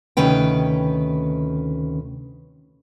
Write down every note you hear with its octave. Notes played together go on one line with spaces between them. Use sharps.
D2 C3 D#3 C#4 B4 G5